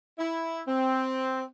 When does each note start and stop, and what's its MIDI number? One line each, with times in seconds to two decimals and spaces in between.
0.19 0.62 64
0.68 1.44 60